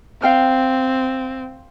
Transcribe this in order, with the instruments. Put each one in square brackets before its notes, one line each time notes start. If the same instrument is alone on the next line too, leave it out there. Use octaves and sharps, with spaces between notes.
[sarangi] C4 [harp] F5 G5 F6